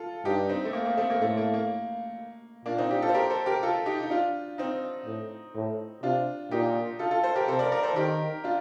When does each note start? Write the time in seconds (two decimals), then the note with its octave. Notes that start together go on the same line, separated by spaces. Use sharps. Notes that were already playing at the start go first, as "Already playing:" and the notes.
Already playing: F4 A4
0.25 G2 D#4 G4
0.49 C4 D#4
0.65 A3
0.73 A#3
0.85 A#3
0.97 A3 C4
1.10 A#3
1.22 A2 A3
1.37 A#3
1.54 A#3
2.65 A#2 A#3 D4
2.78 C4 D#4
2.90 D#4 G4
3.02 F4 A4
3.09 C5
3.14 G4 A#4
3.30 A4 C5
3.46 G4 A#4
3.63 F4 A4
3.86 D#4 G4
4.03 D#4
4.10 D4 F4
4.58 C4 D#4
5.06 A2
5.55 A2
6.03 C3 D4 F4
6.51 A#2 D#4 G4
6.99 F4 A4
7.11 F4 A4
7.24 A4 C5
7.35 G4 A#4
7.48 C3 A4 C5
7.59 A#4 D5
7.72 A#4 D5
7.83 A4 C5
7.96 D#3 G4 A#4
8.44 D4 F4